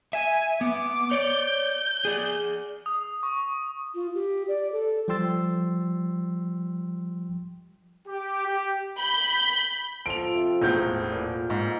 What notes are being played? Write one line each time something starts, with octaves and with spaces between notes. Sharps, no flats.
E5 G#5
B3 D6
C#5 D5 G6
G#4 D5
D#6
C#6
F4
G4
D5
A4
F3 G3 G5 C6 E6 A6
G4
G4
B5 G6
F3 F4 A4 D7 F7
C3
E1 A2 F5 F#5 G6
A#2
G#2 E5